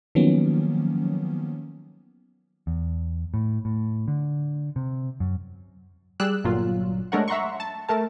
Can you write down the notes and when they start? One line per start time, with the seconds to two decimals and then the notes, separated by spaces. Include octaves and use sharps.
0.15 D#3 F3 F#3 A#3 B3 C#4
2.67 E2
3.34 A2
3.65 A2
4.08 D3
4.76 C3
5.20 F#2
6.20 G3 G#4 D5 E6 F#6
6.44 G1 A#2 F#3 F4
7.12 G#3 A3 D4 A#4 C#5 F#5
7.28 E5 F#5 A#5 C6 C#6
7.60 A5
7.89 A3 A#4 A5